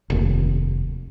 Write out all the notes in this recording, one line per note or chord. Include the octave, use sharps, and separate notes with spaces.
F1 D#2